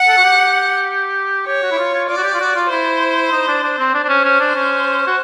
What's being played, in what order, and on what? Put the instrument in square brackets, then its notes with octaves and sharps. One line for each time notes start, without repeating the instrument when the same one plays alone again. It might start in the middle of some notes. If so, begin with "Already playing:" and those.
Already playing: [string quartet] F#5
[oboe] A4
F#4
G4
[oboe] G4 [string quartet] C#5
[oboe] F#4
E4
F4
F4
[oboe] F4 [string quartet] D5
[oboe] F#4
G4
F4
F#4
F4
[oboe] E4 [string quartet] C5
[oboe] D#4
D4
D4
C4
[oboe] D4 [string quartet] C5
[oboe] D4
C#4
C#4
D4
C#4
F#4